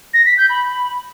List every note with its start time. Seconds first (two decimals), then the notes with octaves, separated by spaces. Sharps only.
0.14 A#6
0.26 B6
0.38 G6
0.50 B5